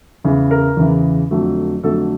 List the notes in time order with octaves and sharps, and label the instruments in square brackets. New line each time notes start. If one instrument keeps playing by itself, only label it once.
[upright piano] E2 C#3 E3
A#4
E2 C#3 E3
F2 D3 F#3 A3
F2 D3 F#3 A3 A4